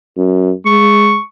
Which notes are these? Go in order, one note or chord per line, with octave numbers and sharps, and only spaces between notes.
F#2
G#3 C#6